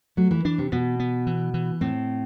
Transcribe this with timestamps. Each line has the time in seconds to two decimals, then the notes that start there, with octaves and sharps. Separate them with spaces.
0.17 F#3 A3
0.31 E3
0.45 E3 D4
0.58 C3
0.72 B2 B3
1.00 B3
1.27 E3
1.54 E3
1.81 A2 C4